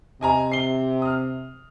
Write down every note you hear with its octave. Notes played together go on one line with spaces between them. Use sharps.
C3 D#5 G#5 A#5
C7 G7
D#6 F6